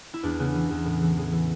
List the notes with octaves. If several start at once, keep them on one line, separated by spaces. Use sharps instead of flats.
E4
E2 D4
C#3 B3
E3
E2
A2
E3
A2 G#4
E3